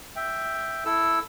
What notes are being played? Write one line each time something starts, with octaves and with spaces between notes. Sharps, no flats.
E5 G5
E4 A4 E6